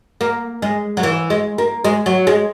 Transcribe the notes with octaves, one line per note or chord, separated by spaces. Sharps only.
A#3
G#3
F#3
E3
G#3
A#3
G#3
F#3
G#3